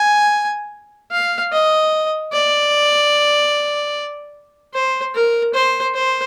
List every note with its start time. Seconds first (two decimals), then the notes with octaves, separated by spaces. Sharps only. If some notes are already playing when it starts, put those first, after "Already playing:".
Already playing: G#5
1.11 F5
1.52 D#5
2.32 D5
4.74 C5
5.14 A#4
5.54 C5
5.95 C5